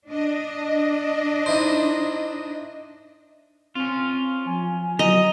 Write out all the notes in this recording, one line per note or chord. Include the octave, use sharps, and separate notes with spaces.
D4 D#5
D#4 E4 C5
C4 C#4 F4
F3 G#5
F#3 D#5 A#5